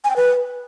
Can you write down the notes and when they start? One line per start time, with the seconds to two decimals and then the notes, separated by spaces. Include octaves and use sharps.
0.04 G#5
0.10 G5
0.16 B4